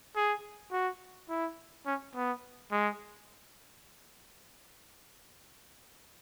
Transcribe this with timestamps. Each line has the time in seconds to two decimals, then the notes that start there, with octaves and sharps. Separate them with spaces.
0.16 G#4
0.72 F#4
1.29 E4
1.86 C#4
2.15 B3
2.71 G#3